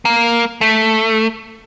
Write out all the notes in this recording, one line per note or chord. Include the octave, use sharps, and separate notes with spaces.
A#3
A3